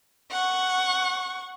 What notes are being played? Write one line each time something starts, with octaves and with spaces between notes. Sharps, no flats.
F#5 C#6